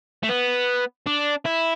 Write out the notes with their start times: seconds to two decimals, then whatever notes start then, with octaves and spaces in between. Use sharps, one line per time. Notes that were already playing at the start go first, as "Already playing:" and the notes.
0.23 A3
0.29 B3
1.07 D4
1.46 E4